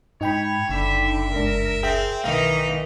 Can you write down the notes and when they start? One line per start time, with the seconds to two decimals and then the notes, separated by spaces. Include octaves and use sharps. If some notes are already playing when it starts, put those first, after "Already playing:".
0.21 G#2 D#4 C#5 G5 B5
0.70 F#1 D3 E5
1.34 G1 C#2 D4 A#4
1.83 C4 G#4 E5 G5
2.24 B1 D#3 E3 D#4 F5